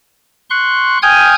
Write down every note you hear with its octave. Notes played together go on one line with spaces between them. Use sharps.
C6 C#6 F#6
G5 G#5 D#6 F6 G6 G#6